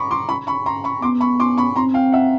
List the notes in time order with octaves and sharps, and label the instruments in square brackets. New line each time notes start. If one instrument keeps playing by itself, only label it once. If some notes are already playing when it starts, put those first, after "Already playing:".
Already playing: [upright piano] A#5 B5 C#6 D6
C6 D6
B5 C#6
B5 C#6
A#5 C6
B5 C#6
[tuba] B3 [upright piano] C6 D6
[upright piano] B5 C#6
C6 D6
B5 C#6
[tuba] C4 [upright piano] A#5 C6
[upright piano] F5 G5
E5 F#5